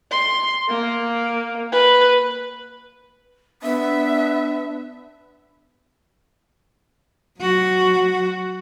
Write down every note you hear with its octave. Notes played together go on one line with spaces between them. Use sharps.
C6
A#3
B4
B3 D4 E5
F#3 F#4